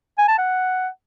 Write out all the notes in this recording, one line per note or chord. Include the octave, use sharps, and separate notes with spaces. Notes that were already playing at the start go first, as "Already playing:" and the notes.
G#5
A5
F#5